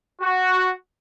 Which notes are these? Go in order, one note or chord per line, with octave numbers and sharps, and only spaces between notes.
F#4